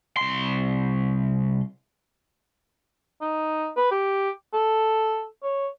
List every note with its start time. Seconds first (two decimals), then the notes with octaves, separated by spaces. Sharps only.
0.17 C2 C6
3.21 D#4
3.77 B4
3.92 G4
4.54 A4
5.43 C#5